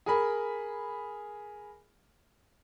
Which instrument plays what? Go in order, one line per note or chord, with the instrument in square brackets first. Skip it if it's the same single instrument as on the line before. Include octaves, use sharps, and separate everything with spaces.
[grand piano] G#4 A#4 B5